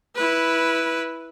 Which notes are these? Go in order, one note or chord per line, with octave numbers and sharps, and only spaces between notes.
E4 B4